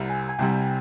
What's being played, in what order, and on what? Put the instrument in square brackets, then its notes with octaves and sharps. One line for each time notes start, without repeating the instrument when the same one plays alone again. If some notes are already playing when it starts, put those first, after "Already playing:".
Already playing: [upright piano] C2 C3 G3
[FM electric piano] G#5
G#5
[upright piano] C2 C3 G3 [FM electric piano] G5